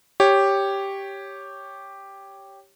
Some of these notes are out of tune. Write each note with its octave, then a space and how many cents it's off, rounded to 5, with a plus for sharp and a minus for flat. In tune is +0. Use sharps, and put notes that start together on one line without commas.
G4 +0 C#5 +0